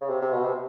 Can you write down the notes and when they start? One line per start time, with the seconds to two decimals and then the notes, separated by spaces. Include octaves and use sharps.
0.01 C#3
0.09 C3
0.22 C3
0.33 B2
0.45 C3